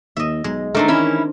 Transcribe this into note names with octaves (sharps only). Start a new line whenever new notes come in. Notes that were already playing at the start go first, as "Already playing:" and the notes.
D#2 D#5 E5
B1 G#3
D#3 A3 C4 D4 A#4
E3 C#4 E4